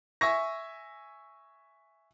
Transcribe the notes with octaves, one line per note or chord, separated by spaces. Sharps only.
E5 G#5 C#6 A#6